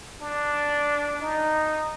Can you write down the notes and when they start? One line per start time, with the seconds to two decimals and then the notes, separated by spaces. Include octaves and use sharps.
0.21 D4
1.21 D#4